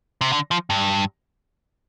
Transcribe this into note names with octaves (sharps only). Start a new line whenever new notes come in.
C3
D3
F3
G2